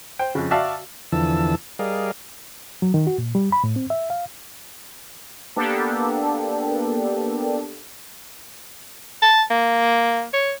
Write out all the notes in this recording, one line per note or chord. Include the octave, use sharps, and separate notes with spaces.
C5 G5
F2 C#3
F#4 D5 E5 F5 A5 E6
E2 D3 E3 F3 A5 E6
G3 G#4 A#4 D5 D#5 F5
F#3
D#3
F#4
A#2
G3
B5
A2
C4
E5
F5
A#3 B3 D4 G4 A4
A5
A#3
C#5